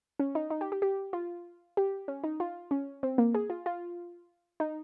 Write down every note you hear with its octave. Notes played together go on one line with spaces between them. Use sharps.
C#4
D#4
D#4
G4
G4
G4
F4
G4
C#4
D#4
F4
C#4
C4
A#3
G#4
F4
F4
D#4